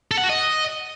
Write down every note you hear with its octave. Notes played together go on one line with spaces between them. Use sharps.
A4
F#5
F#4
D#5